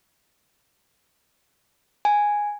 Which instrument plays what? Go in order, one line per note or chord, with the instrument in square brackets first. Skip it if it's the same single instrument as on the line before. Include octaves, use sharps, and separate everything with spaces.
[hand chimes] G#5